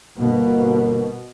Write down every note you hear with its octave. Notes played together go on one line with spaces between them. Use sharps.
G1 B2 A#3